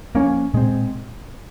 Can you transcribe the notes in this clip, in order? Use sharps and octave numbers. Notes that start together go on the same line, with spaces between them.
F3 A#3 C#4
A#2 G#3 C4